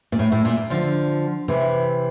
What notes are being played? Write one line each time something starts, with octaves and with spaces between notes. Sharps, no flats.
A#2
A2
A2
A#2
D3 F3
C3 E3